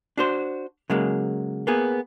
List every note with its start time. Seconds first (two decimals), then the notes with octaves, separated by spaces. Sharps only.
0.18 D4 F#4 C5
0.90 C#3 F#3 G#3 A#3
1.67 A#3 B3 G#4